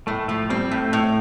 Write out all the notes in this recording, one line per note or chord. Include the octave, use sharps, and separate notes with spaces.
A2 A3
F3 A3
G3 C4
A2 A3
A2